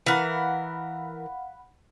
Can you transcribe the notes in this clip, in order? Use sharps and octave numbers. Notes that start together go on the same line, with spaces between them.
E3 A#4 F5 F#5 B5